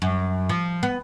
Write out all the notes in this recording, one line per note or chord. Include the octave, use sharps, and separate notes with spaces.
F#2
F3
B3